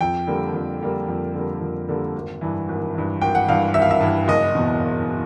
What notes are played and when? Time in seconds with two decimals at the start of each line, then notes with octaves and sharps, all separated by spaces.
0.01 F2 G5
0.27 D3 G3 A#3
0.54 F2
0.81 D3 G3 A#3
1.08 F2
1.34 D3 G3 A#3
1.61 F2
1.89 D3 G3 A#3
2.15 G#1
2.41 G2 E3
2.68 G#1
2.95 G2 E3
3.21 G#1 G5
3.35 F#5
3.48 G2 E3 F5
3.74 G#1 E5
3.82 F5
3.91 E5
4.01 G2 E3
4.28 F#1 D#5
4.55 E2 B2